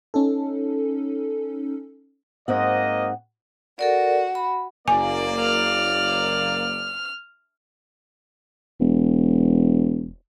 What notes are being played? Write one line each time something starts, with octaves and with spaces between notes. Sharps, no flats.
C#4 D#4 A4
G#2 A#3 C4 D#5 F#5
F#4 A4 A#4 D5
B5
F#1 A#3 D5 G#5
F6
E1